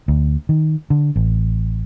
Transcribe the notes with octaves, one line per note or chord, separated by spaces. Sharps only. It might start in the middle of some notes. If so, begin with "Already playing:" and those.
D2
D#3
D3
A1